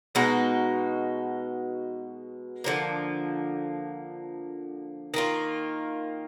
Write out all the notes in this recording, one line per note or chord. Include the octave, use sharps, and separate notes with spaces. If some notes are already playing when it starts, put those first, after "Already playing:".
B2 G#3 D#4 F#4
D3 F3 A#3
D#3 A#3 F4